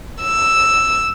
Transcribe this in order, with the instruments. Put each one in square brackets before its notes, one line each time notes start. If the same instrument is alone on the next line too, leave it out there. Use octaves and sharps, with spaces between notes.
[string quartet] E6